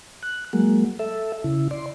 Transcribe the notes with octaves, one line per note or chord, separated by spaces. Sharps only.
F#6
F#3 G#3 A#3
A4 E5
C#3 E4
D5 C6